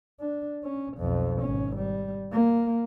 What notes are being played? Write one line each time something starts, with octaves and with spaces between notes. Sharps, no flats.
D4
C#4
B1 F2
G#1 C#4
G3
A#3